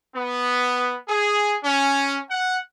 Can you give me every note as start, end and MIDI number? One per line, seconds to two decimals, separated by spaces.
0.16 0.96 59
1.09 1.56 68
1.64 2.18 61
2.30 2.57 78